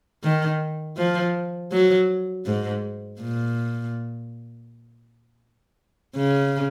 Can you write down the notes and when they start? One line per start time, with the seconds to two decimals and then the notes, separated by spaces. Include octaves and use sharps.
0.24 D#3
0.97 F3
1.72 F#3
2.46 G#2
3.20 A#2
6.16 C#3